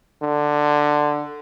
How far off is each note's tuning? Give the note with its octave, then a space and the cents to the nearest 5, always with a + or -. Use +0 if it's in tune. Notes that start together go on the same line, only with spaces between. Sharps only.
D3 +10